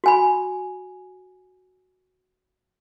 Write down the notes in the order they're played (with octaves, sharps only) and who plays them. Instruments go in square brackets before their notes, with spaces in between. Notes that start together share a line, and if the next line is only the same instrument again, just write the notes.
[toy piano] F#4 G#5 B5